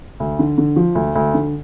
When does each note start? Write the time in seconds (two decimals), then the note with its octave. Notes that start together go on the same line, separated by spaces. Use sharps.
0.20 D2
0.39 D3
0.58 D3
0.76 F3
0.95 D2
1.15 D2
1.34 D3